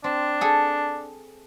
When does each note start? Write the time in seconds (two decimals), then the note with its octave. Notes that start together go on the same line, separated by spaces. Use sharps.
0.04 C4 D4
0.41 G#4 A4 G#5